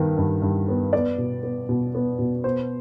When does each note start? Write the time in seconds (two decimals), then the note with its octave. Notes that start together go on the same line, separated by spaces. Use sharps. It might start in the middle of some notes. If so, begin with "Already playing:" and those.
Already playing: G2 D#3 B3
0.17 G2
0.42 G2
0.68 B3
0.93 B3 D5
1.18 B2
1.43 B3
1.69 B2
1.95 B3
2.19 B2
2.44 B3 C5